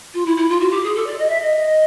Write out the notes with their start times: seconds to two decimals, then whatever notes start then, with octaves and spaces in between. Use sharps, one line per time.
0.14 F4
0.26 E4
0.37 E4
0.49 F4
0.60 F#4
0.71 G4
0.84 G#4
0.95 A4
1.07 D5
1.18 D#5
1.28 E5
1.41 D#5